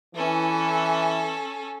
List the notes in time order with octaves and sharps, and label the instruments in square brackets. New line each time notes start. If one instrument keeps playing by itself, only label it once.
[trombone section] E3 [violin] C#4 A4